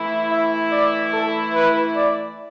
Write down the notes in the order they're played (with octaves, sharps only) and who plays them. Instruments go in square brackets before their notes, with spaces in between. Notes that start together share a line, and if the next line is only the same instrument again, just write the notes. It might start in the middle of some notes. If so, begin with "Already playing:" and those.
Already playing: [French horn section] E3 A3 E4
[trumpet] E5
D5
A4
B4
D5